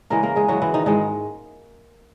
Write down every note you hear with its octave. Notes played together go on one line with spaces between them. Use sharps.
C#3 E3 G#3 A#3 A#4
A#3 A#4
G#3 G#4
C#3 E3 F#3 G#3 F#4
E3 E4
D#3 D#4
G#2 D#3 E3 G#3 D#4